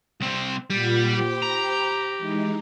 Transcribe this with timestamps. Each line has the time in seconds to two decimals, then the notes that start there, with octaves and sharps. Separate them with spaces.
0.21 C2 C4
0.70 A#2 G3 F4 F#5
1.12 G4 C5 G5 B5
1.42 A#5
2.18 E3 G#3 D#4